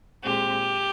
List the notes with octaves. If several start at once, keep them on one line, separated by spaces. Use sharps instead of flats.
A#2 G#3 C4 G4